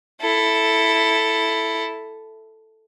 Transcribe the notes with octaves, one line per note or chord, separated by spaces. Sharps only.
E4 A4